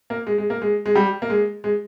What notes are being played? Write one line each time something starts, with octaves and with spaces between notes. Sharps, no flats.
A#3
G#3
G#3
A#3
G#3
G#3
G3
A#3
G#3
G#3